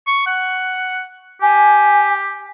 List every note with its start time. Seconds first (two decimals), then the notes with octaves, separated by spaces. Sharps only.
0.07 C#6
0.27 F#5
1.42 G4 G#5